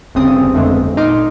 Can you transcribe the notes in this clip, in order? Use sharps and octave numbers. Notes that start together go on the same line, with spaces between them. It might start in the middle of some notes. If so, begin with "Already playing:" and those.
G1 E2 C#3 C4 D#6
F2 D3 G#3 A3 B3 C4
G1
A#2 D#4 C6 D6 F6